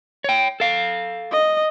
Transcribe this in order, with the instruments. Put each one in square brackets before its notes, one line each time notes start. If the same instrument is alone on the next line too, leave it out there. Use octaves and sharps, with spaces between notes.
[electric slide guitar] C#5 G5
A4 F5
[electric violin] D#5